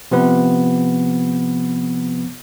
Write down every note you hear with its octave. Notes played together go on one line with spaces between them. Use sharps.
C3 F3 B3 B4